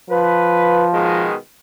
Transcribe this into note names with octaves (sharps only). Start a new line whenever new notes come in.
F3 B4
B2 D#3 G#3